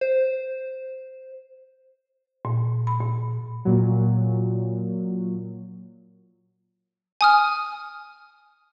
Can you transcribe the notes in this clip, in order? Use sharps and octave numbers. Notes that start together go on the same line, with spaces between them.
C5
A#2
B5
A#2
A#2 F#3
G#5 D#6 F6